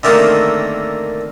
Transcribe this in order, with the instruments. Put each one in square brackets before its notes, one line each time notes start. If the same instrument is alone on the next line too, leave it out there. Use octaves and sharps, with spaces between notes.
[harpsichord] D3 D#3 A3 A#3 C4